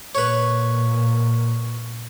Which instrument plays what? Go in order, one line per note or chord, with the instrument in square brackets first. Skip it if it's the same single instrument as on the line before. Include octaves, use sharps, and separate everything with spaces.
[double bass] A#2 [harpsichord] B4 C#5